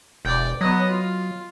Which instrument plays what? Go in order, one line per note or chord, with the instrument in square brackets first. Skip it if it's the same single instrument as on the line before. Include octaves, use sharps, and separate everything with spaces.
[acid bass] E1 [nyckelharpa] D5 G5
[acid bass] F#3 [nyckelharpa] B3 D#5
[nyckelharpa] F4